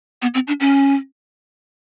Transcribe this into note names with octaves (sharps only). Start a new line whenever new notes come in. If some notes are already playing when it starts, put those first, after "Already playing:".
B3
C4
D4
C#4